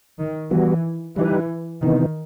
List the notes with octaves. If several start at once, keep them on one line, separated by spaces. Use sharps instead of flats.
D#3
E3 G3 B3 F#4
E3 G3 D#4 G4 B4
C3 D#3 E3 B3 D#4